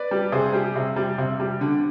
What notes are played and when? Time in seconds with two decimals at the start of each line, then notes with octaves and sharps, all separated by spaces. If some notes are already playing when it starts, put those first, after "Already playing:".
Already playing: B4 D5
0.11 G3
0.32 C3 G#4 C5
0.53 G3
0.76 C3
0.96 G3
1.18 C3
1.40 G3
1.61 D3